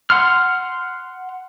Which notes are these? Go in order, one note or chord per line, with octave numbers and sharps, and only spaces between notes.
F#5 C6 F6